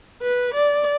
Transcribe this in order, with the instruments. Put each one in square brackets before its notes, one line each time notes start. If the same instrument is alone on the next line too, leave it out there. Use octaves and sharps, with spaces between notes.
[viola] B4
D5